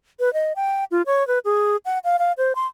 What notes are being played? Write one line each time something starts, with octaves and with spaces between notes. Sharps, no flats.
B4
D#5
G5
F4
C#5
B4
G#4
F#5
F5
F5
C5
C6